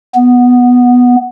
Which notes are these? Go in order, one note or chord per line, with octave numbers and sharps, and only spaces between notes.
B3